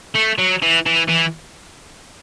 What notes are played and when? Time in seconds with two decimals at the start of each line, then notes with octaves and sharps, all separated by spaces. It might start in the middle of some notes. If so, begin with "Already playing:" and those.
0.15 A3
0.38 F#3
0.62 E3
0.86 E3
1.09 E3